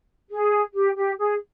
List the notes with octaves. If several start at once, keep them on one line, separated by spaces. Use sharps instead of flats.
G#4
G4
G4
G#4